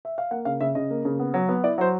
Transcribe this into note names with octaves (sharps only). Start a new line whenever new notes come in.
E5
F5
A#3 F#5
C#3 F5
C#3 E5
C#3 D#5
A#3
C#3
B3
F#3
B3
E4 D5
F#3 C5